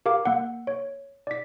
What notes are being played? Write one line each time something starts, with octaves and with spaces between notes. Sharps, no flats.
G4 A#4 F5 D6
A#3 F#5
C#5
D5 B6